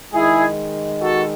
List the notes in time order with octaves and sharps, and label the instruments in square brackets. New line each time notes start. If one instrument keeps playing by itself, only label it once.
[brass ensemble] D#3 G#3 E4 G#4
F#4 A4